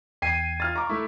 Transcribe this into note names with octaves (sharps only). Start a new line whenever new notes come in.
E2 G5 G#6 C7 D#7
F4 F6 A6
A#5 C#6 D6
A3 E4